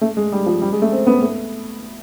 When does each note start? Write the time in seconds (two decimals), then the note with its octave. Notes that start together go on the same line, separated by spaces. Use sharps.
0.01 A3
0.17 G#3
0.32 G3
0.46 F3
0.62 G3
0.72 G#3
0.82 A3
0.92 C4
1.07 B3
1.22 A3